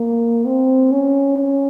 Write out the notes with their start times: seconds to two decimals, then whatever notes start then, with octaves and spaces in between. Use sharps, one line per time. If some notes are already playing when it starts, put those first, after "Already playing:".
Already playing: A#3
0.45 C4
0.91 C#4
1.37 C#4